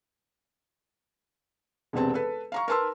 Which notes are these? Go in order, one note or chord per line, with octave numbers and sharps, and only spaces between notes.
E1 C3 B3 C4 A5
A4 B4
F5 A#5 C#6
A#4 B4 A5 C6 E6